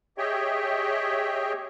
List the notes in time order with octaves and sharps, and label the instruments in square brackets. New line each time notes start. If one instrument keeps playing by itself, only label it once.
[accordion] G4 G#4 C#5 D#5 E5 G5